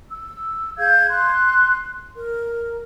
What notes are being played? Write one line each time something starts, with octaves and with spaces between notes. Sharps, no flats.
E6
G#4 F5 G6 G#6
C6 F#6
A#4